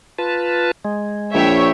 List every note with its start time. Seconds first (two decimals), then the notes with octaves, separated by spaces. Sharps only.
0.18 F4 B4 A5
0.85 G#3
1.34 A#1 C#5 E5 G5